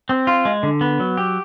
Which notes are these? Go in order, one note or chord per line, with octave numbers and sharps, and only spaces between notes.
C4
F4
G#3
D3
B3
F#3
G4